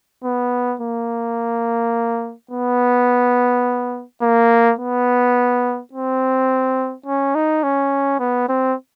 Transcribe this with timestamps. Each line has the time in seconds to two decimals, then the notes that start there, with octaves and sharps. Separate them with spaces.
0.24 B3
0.81 A#3
2.51 B3
4.22 A#3
4.79 B3
5.93 C4
7.06 C#4
7.35 D#4
7.64 C#4
8.19 B3
8.49 C4